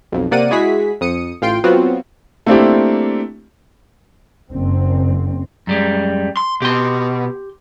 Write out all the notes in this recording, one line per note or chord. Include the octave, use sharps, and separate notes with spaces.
B1 F2
C3 A#3 D5 F#5 D#7
G#3 E4 F#4 G#4 B6
F2 D#6 C#7 D#7
A1 F4 G5 C6 D7
F#3 B3 C4 F4 F#4
A3 A#3 C4 D4 E4 G4
F#1 C4
F#2 G3 G#3
C6
B2 G4 C6